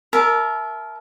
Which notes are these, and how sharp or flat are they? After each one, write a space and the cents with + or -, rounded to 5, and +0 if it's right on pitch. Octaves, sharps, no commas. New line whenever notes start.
A#4 +0 E5 +0 A5 -35